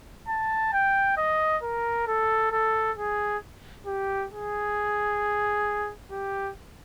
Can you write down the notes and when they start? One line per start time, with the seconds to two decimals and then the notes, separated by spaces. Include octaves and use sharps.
0.28 A5
0.73 G5
1.17 D#5
1.63 A#4
2.07 A4
2.51 A4
2.97 G#4
3.86 G4
4.32 G#4
6.11 G4